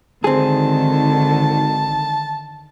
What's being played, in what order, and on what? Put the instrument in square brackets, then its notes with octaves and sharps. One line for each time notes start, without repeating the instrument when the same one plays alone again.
[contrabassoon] G#1 [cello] D3 D#3 [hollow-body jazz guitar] C4 G#4 [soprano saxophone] A5